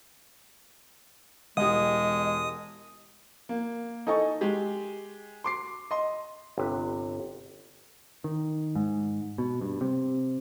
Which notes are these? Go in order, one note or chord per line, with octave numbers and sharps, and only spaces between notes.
E1 G#3 G4 D#5 D#6
A#3
D#4 A4 D#5 G#5 C#6
G#3 G4
C6 D6 C7
D#5 C6
G1 C3 B4
D#3
G#2
B2
G2
C3